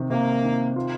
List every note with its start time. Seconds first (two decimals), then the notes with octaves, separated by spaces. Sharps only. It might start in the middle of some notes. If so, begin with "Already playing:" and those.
Already playing: C3 D#3
0.10 C3 A#3
0.43 D#3
0.76 F4